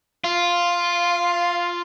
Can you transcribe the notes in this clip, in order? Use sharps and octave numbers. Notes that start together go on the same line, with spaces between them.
F4 F5